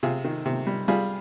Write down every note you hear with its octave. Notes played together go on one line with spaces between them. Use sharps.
C3 F4 G#4
D#3
C3
G3
G3 F4 G#4